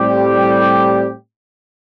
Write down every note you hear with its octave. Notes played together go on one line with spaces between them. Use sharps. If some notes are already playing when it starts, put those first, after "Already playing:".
Already playing: A2 G3 C4 G4